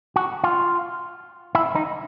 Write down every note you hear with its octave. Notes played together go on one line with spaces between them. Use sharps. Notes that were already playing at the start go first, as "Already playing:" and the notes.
F#4
F4
E4
D#4